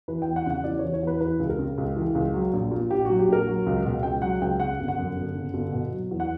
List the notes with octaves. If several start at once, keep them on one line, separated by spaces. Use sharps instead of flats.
E3 B4
G5
E2
F#5
C#3 F#5
E2 D5
E3 C#5
C#5
E2 B4
E3 B4
C#2
A#4
C#3
C#2
E3
C#2
F#3
A#1
A#2
A#1 G4
F#3 F#4
G4
A#1 A#4
F#3
C#2
B2
C#2 G5
F#3 F#5
C#2 G5
C#3 F#5
G1
F#5
F#2
G1
C#3
G1
B2
F#3
E2
F#5